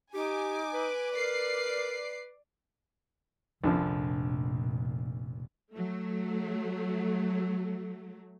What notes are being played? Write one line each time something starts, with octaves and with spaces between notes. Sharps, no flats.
D#4 G4 G#5 D6
B4
A#4 D5 D6 C7
F1 A#1 A#2 D3 F3
F#3 A3